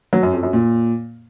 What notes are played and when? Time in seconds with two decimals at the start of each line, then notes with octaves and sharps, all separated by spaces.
0.13 F#3
0.23 F#2
0.33 F2
0.43 F#2
0.53 A#2